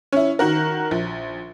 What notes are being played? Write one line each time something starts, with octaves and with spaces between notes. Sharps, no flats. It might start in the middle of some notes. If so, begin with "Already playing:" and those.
C#4 E4
D#3 F#4 A#4
A#1